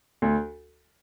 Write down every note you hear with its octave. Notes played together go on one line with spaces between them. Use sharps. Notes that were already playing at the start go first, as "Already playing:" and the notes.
D2